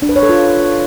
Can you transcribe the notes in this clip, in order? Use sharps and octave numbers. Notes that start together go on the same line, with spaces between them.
D4
B4
C#5
A4
F4